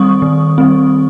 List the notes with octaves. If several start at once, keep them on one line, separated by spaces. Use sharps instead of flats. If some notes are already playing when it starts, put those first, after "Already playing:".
Already playing: D#3 G3 C4 C#6 D#6
D#3
G3 C4